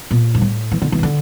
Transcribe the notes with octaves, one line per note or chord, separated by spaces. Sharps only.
A#2
G2
A2
E3
D3
E3
C3
D3